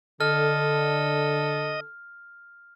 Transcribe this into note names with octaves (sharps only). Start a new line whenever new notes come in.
D3 A4 D#5 F6